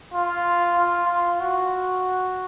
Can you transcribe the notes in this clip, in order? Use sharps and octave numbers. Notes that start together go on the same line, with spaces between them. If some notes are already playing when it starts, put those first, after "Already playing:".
F4
F4
F4
F#4